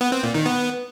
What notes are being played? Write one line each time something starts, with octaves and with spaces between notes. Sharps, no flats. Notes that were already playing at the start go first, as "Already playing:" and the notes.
B3
C4
A#2
D#3
B3